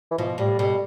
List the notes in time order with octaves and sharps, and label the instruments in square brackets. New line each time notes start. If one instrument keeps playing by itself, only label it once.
[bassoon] E3
[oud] B2 [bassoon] F3
[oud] A2 [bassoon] G3
[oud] B2 [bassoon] G3